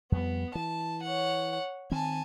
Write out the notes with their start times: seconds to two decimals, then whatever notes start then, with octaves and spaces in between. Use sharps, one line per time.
0.12 F2 G3 B3
0.55 E3 A5
1.04 C#5 F#5
1.92 D#3 C4 G#5 A5